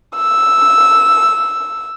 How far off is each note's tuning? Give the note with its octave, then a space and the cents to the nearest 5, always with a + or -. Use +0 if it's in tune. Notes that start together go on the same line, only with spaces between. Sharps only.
E6 -5